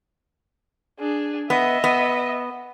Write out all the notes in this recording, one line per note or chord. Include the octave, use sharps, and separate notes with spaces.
D4 G#4
B3 D#5 E5
B3